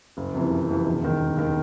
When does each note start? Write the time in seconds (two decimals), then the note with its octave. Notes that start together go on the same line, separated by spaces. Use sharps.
0.17 F#1
0.34 F2 C3 E3
0.50 F#1
0.68 F2 C3 E3
0.86 E1
1.02 D#2 D#3
1.20 E1
1.37 D#2 D#3